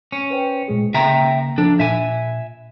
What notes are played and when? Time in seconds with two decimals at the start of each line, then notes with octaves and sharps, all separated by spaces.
0.12 C#4
0.30 B4 C5 G5
0.68 A#2 G#3 G#4
0.94 C#3 A#3 E5 G5 A#5
1.58 F3 D4 A4
1.80 A#2 E5 G#5